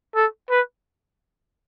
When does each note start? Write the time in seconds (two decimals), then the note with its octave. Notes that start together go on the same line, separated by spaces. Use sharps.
0.15 A4
0.50 B4